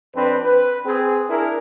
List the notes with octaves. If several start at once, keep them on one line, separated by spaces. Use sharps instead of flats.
F2 C4 D4 B4
B4
C4 G#4
D4 E4 G#4 A#4